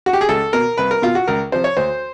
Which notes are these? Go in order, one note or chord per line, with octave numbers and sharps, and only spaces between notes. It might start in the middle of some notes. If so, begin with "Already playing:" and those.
F#4
G4
G#4
C#2 A4
B2 A#4
C2 B4
A#4
B2 F4
F#4
C#2 A#4
C3 F3 C5
C#5
D2 C5